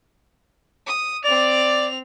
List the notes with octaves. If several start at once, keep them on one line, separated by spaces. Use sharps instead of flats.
D#6
C4 D5 F7